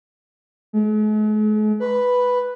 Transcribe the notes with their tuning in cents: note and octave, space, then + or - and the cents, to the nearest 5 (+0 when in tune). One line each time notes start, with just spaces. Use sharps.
G#3 +45
B4 +0